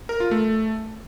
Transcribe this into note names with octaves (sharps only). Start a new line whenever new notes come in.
A#4
F4
A3